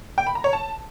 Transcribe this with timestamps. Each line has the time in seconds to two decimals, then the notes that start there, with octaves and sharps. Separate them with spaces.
0.18 G5
0.27 B5
0.35 A#5
0.44 C#5
0.53 A5